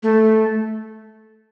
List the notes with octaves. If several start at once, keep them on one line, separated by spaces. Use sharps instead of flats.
A3